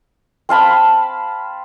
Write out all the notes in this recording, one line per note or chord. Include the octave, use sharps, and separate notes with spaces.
C4 F5 A5 B5